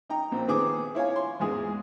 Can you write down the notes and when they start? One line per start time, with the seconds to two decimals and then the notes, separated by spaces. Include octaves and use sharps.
0.09 D#4 G5 A#5
0.31 A#1 C4
0.48 D#3 B3 C4 G#4 C5 D6
0.95 E4 C#5 F5 G#5
1.16 C6
1.40 E2 G#2 G#3 G#4